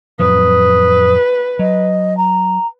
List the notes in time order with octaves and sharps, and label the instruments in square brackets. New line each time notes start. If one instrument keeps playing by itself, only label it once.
[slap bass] F2 A2 F#3 [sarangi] B4 [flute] D#6
[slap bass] F#3 [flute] D#5
[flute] A#5